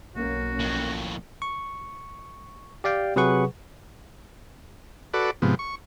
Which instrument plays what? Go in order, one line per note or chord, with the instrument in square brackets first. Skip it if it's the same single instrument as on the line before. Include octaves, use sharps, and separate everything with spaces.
[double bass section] B1 A#3 C#4 [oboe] F#4
[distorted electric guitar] F2 A2
[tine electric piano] C#6
G4 D5 F5 G5
C3 F#3 G#4 B4 F#5 C#6
[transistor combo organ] F#4 A4 B4 D5
G#2 C3 F3 B3
C#6